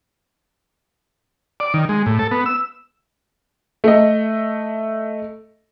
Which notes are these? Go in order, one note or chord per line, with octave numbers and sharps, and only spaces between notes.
D5
D#3
G#3
A2
A4
B3
E6
A3 D#5